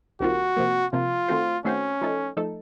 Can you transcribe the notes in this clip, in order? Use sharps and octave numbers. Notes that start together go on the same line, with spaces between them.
C2 C3 D#3 A#3 F4 F#4
C3 F3 A#3
C3 F3 A#3 F4
D#3 A3 C4 F#4 C5
D#3 A3 C4 C#4 F#4 C5
F3 A3 D#4 A4
F3 A3 D#4 A4